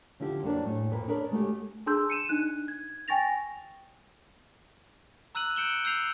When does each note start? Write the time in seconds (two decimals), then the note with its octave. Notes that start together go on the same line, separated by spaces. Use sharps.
0.20 D3 F3 E4 G4
0.43 F2 F#3 A#3 D4
0.64 A2 G#4
0.91 F2 A#2 B4
1.08 D4 G#4 A#4 B4 C#5
1.31 G#3 A3 F#4 G4
1.86 D4 G#4 A5 C6 E6 G6
2.10 C#7 D#7 E7
2.29 D4 D#4 F#6
2.68 G#6
3.08 G5 G#5 C#6 A6 A#6 F7
5.35 A#5 E6 F#6 D#7 F#7
5.56 G6 C#7 D7 E7 F#7 G7
5.85 E6 G6 C7 F7